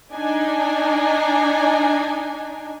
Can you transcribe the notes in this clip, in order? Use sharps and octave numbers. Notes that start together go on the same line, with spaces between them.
D4 D#4 G#5